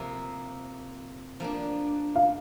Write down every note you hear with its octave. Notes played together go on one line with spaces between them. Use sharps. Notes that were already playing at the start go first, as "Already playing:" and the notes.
Already playing: C3 F3 A#3
F3 A#3 D4
F5